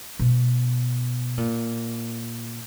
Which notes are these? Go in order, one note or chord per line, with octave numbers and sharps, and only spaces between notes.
B2
A#2